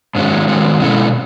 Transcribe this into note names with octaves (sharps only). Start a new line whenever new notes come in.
G#2 D#3 G#3 C#4 F#4
G#2 D#3 G#3 C#4 F#4
B2 G#3 C#4 E4 A4